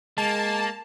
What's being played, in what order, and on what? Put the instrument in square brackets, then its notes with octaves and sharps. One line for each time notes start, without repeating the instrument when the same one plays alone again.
[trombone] G#3 [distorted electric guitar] A#3 [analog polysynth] A5